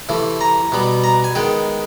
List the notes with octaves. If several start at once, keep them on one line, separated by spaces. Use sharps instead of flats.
C3 E3 A3
A#5
B2 G3 B3
A#5
G#5
D#3 G#3 B3 G5